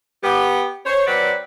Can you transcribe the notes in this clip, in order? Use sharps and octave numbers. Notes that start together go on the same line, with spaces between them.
B3 G4
C5 C#5
F#3 C4 B4 D5